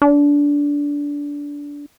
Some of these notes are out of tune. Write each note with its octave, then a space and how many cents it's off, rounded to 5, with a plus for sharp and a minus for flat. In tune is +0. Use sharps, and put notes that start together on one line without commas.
D4 -20